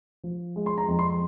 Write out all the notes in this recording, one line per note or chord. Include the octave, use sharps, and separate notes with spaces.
F3
G#3
C6
A#5
F2
C6